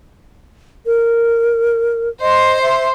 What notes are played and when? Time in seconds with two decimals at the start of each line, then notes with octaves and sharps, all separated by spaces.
0.86 A#4
2.21 C5 D#5 C6
2.62 E5